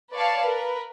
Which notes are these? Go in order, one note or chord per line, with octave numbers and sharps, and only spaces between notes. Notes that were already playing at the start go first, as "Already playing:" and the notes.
B4 C#5 D5 F5 A5
A#4 B4